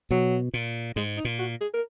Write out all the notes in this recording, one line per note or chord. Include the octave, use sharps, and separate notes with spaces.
B2 F#3
A#2
G#2 G#3
D#4
A#2
F#4
G#4
A#4